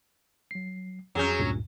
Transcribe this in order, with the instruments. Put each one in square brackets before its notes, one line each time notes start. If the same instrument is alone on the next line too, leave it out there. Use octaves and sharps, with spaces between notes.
[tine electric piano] F#3 C7
[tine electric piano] F2 G#4 G6 [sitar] F#3 C#4
[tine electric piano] D2 G2 A#2